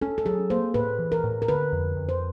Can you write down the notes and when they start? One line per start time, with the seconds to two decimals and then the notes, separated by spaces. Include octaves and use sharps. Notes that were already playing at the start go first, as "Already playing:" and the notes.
0.02 C#4 A4
0.18 A4
0.25 F#3 G#4
0.50 A#3 C5
0.74 A2 B4
0.99 E3
1.12 A#4
1.24 A2
1.42 A#4
1.48 D3 B4
1.73 F2
1.96 F2
2.09 C5